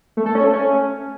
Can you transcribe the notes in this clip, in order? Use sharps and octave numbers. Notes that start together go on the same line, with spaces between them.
A3
A4
C#4
A3
C#4